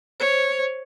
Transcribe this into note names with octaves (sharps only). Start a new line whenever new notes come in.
C5 C#5